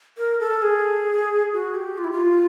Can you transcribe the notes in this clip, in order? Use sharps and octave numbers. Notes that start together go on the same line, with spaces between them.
A#4
A4
G#4
F#4
G4
F4
E4
F4